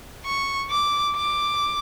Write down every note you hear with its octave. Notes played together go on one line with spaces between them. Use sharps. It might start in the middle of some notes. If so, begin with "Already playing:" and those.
C#6
D6
D6